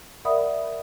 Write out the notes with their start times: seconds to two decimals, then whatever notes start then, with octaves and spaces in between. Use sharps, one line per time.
0.25 A#4 D5 E5 F#5 B5 D#6